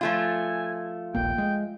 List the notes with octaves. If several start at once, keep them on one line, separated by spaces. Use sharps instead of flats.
F3 A3 F4 G#5
D#1 A#1 A#3 G5
G#3